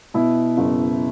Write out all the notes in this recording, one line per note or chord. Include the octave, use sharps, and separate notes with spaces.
B2 E4
F#1